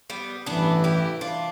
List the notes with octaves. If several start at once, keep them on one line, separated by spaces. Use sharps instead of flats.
G3 B3
A1 G2 E3 B3 D4
E4 G4
D4 F4